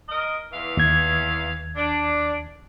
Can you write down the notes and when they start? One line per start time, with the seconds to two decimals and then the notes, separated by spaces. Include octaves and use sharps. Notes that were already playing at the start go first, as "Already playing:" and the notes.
0.09 A#4 D#5
0.52 E2 E3 F5
0.77 D#2 G#6
1.75 D4